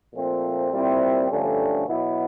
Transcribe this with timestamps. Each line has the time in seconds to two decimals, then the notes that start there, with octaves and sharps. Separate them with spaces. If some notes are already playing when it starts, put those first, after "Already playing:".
0.14 A#2 F3 A3 C4
0.71 A#2 G3 C4 E4
1.29 G2 D3 F3 A3 C#4
1.87 B2 F#3 B3 E4